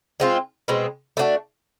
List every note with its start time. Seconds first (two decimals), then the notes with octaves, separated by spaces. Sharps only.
0.20 G#3 C4 F4
0.68 B2 G#3 C4
1.17 A3 D4 F#4